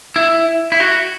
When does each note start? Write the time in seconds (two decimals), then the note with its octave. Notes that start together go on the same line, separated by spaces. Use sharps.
0.16 E4
0.72 E4
0.80 F#4